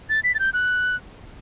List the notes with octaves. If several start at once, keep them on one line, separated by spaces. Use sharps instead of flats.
A6
B6
A6
G6
F#6